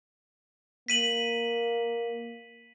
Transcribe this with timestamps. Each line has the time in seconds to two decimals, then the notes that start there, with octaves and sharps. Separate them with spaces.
0.88 A#3 B6 D#7 F#7